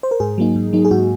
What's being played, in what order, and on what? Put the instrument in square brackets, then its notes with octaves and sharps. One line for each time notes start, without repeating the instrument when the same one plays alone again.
[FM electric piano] C5
A#4
G#2 G#4
F#3 A#3 D#4
G#2
F#3 A#3 D#4
G#4
G#2 F#4